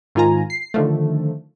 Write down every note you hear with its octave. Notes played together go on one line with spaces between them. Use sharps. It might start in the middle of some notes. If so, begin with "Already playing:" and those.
G#2 D#3 F4 G#5 A#5
C7
D3 D#3 F3 A3